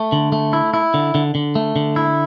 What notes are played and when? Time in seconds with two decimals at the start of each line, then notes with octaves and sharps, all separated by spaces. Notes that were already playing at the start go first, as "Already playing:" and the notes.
Already playing: A3
0.12 D3
0.32 A3
0.53 E4
0.74 E4
0.94 D3
1.15 D3
1.35 D3
1.55 A3
1.76 D3
1.96 E4